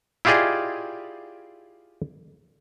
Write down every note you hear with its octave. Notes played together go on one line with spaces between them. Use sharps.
E4 F4 G4 G#4 D5 D#5